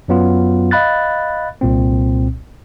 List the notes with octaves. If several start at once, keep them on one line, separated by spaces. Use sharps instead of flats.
F#2 F#3 B3 F4
D#5 F5 B5 F#6 A6
C2 A#2 C4